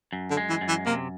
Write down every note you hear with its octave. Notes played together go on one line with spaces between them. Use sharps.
F#2
D3
G#3
E3
F#2
E3
C3 A#3